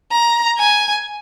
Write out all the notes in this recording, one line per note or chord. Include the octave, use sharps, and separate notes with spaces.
A#5
G#5